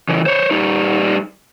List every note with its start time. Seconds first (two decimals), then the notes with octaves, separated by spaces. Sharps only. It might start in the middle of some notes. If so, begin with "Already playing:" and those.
0.09 C#3 E3
0.26 C5 C#5
0.51 G3 D#4